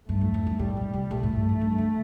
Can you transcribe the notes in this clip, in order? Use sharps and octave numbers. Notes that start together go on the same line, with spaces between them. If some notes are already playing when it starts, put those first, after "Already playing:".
G2 A3
F2
F2
G2
A2 G3
A#2
C3
A#2 A3
A2
G2
F2
G2
D3